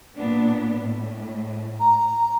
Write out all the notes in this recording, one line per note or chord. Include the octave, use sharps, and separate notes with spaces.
A#2 B3 D4
A2
A#5